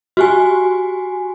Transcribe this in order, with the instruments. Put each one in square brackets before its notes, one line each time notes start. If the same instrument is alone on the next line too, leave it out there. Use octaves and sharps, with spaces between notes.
[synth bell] F#4 G4 G#5